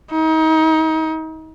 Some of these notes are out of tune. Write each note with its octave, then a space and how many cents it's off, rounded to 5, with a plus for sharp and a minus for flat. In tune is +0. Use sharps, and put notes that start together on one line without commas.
D#4 +30